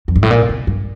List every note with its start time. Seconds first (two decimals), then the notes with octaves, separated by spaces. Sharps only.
0.08 F2
0.16 G2
0.23 A2
0.31 A#2
0.49 C3
0.67 G2